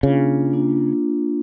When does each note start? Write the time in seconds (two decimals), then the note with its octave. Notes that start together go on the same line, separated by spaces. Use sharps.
0.03 C#3 A#3 D4 F4
0.53 A#3 D4 F4